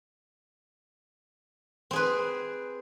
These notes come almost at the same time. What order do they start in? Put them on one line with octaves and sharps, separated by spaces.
C4 G#4 B4